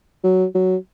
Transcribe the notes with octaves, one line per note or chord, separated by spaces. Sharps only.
F#3
F#3